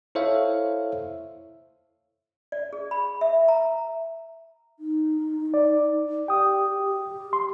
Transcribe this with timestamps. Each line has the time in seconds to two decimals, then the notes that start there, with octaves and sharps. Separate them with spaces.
0.15 E4 A4 C5 C#5 E5 F5
2.52 D5
2.73 G#4
2.91 B5
3.21 E5
3.48 A#5
4.80 D#4
5.54 D5
6.28 G4 G5 D#6
6.82 G4
7.33 C6